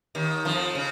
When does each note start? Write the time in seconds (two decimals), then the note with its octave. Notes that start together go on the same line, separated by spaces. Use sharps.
0.15 D#2 D#3
0.45 F2 F3
0.75 C#3